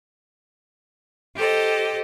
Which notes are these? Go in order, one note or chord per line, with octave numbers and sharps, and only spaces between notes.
G4 A4 C5 D#5